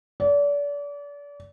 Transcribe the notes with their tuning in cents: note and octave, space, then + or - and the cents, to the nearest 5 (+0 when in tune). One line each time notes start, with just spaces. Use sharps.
D5 -35